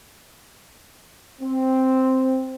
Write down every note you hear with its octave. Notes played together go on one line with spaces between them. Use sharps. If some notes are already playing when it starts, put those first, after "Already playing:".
C4